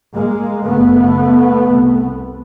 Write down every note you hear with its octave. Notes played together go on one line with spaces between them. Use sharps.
G#3 A#3
F#1 F#2 C#3 A3 B3
C2 C3